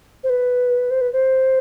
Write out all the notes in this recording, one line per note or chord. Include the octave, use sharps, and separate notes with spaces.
C5
B4
C5
B4
C5